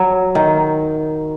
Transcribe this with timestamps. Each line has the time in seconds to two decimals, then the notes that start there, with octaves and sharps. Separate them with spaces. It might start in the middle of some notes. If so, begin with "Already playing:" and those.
Already playing: F#3
0.35 D#3